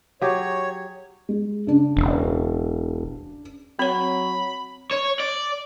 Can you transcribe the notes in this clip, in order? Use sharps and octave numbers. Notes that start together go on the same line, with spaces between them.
F#3 G4 G#4 C#5
G#3
C#3 D4
E1
F#3 C4 C#5 B5
C#5
D5